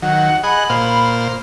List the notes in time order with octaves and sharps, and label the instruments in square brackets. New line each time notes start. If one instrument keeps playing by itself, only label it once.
[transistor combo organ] D#3 F#3 [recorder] F#5
[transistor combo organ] G#4 D#5 F#5 [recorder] B5
[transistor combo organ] A#2 C5 F5